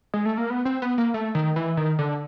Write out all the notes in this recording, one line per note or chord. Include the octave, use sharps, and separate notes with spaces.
G#3
A3
A#3
B3
C4
B3
A#3
A3
D#3
E3
D#3
D3